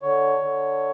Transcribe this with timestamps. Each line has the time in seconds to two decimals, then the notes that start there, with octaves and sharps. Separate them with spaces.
0.02 D3 C#5
0.39 D3